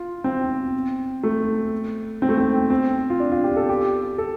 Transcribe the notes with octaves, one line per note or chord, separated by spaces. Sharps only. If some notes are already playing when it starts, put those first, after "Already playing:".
Already playing: F4
C4
A3
C4
A3
C4
C4
F4
D4
F4
G4
A4
G4
A4